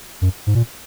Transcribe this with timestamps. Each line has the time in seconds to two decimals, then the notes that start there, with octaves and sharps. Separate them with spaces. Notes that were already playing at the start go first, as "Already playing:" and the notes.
0.22 F#2
0.47 G#2
0.55 A#2